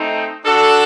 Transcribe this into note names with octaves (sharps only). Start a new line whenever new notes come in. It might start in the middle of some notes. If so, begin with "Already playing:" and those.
Already playing: A3 C4 D#4
D4 F#4 A4